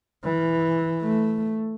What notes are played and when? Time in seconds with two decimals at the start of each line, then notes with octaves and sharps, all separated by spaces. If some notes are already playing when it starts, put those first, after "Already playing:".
0.24 E3
1.03 A3